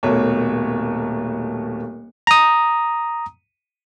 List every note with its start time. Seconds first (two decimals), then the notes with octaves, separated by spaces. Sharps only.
0.03 D#1 B2 A3 A#3 C#5
2.27 A#5 D#6